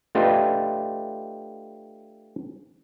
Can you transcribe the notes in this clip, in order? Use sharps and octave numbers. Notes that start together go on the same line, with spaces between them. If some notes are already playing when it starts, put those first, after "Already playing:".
A3 D4 F4 G4 B4 D#5